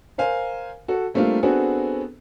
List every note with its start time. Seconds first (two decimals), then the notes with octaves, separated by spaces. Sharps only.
0.18 A#4 C5 F5 G#5
0.88 F#4 A4
1.14 G3 A3 A#3 C4 D4 F4
1.43 B3 C4 D4 F#4 G#4 A4